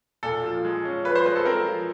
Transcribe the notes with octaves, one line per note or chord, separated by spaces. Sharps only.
A#2 A4
F3
G#3
C#4
F3 B4
C5
G#3 B4
A4
C4 A#4
F3